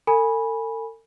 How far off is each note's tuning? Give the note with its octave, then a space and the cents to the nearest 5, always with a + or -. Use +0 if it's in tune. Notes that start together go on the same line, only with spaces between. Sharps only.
A4 +45 G#5 -5 B5 -15